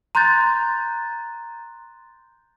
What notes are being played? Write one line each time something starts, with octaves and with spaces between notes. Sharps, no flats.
A#5 C6 F#6 G6 A6